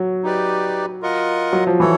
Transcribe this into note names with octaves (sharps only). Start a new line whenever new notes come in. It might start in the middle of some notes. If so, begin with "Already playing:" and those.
Already playing: F#3
D#4 G4 B4 D5
F4 A#4 D#5 F#5
F#3
F3
E3 E4 A4 C#5